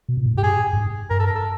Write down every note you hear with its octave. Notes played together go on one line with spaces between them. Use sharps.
B2
A#2
A2
G#2 G4
G2 G#4
G2
G#2
G2 A#4
A4
A#4
A4